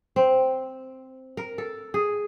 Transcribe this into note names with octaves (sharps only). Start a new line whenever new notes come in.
C4
A#4
A4
G#4